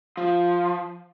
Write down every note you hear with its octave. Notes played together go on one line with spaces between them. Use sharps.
F3